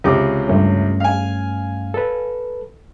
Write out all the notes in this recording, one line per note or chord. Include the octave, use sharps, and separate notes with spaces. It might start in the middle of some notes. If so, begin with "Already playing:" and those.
C#2 C3 D6
G2 A3 C#4
F5 G#5
A4 B4